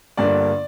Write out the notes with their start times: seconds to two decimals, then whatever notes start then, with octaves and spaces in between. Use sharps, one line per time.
0.17 G1 G2 D3 A#3 D4 D5